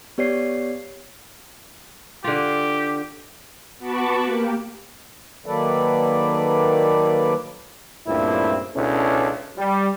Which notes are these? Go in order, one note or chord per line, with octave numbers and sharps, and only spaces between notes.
B3 G4 C#5 D5 C7
D3 F4 G4
B3 F#4 A5 B5 C#6 D6
A#3 G4
D#3 F#3 A#3 A4 B4 D5
C#2 G2 A#2 A3 C4 E4
C#2 B2 C#4 D4 E4 A4
G3